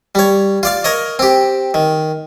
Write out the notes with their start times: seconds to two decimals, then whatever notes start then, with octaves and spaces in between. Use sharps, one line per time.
0.15 G3 C#5
0.63 F4 D5 F5
0.84 A#4 C#5 D#5
1.19 C4 G4
1.74 D#3